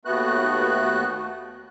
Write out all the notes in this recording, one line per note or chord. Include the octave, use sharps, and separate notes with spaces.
D#2 A3 B3 F#4 F#6